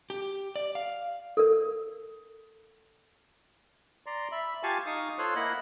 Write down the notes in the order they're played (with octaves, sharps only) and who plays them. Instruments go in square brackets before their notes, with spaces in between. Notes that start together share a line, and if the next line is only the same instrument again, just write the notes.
[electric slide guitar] G4
D5
F5
[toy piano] A4 A#4
[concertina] D5 A#5 C6
E5 B5
F4 G4 F5 G#5 A5 C#6
D#4 F5 C#6 D#6
F4 A4 C5 C#5 C6 F#6
A#3 E4 D#5 F#5 B5